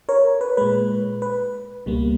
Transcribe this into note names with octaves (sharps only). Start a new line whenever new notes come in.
A#4 C#5
B4
A#2 G#3 B4
B4
C#2 B2 G3 A#3